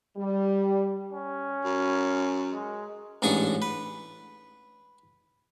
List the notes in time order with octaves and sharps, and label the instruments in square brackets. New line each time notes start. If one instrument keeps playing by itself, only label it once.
[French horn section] G3
[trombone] C#4
[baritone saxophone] F#2
[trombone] G#3
[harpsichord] A1 G#2 D4 C#6 D#6
B4